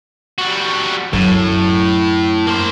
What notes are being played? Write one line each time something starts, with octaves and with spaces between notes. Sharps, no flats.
G3 F#4
F#2 A2
A#3 C5